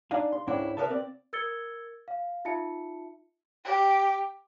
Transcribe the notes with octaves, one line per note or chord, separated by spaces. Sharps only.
D4 D#4 D5 F5 G#5
C6
C#2 G#2 C#4 D4 E4 G5
A#4 B4 C#5 D#5 E5 A5
C4 D5
A#4 E6 G#6 A6 C#7 G7
F5
D#4 F4 E5 A5 C#7
G4